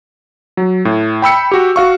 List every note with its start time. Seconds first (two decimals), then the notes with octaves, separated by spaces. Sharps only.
0.57 F#3
0.85 A2
1.22 G5 B5 E6 C#7
1.52 F#4 G4
1.76 F#4 F5 C#6